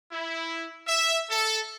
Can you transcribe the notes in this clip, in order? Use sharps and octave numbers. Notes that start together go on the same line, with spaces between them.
E4
E5
A4